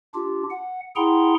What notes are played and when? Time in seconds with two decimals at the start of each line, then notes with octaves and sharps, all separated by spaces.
0.15 D4 F4 G4
0.50 F#5
0.96 E4 G#4 F#5 G5 A#5 C6